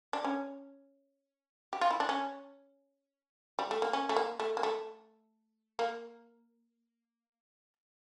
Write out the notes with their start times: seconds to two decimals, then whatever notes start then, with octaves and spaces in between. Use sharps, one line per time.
0.13 D4
0.24 C#4
1.73 G4
1.81 F4
1.91 E4
2.00 D4
2.09 C#4
3.59 G3
3.71 A3
3.82 A#3
3.93 C#4
4.09 A3
4.16 A#3
4.40 A3
4.57 A#3
4.63 A3
5.79 A#3